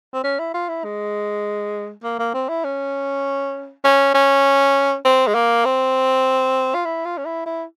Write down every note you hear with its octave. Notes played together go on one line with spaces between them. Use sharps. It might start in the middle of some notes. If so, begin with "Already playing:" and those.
C4
C#4
E4
F4
E4
G#3
A#3
A#3
C4
E4
C#4
C#4
C#4
C4
G#3
A#3
C4
F4
E4
F4
C#4
E4
E4